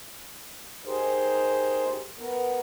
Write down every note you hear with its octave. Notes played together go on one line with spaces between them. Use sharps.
D#4 G4 G#4 A#4 C5
B3 A#4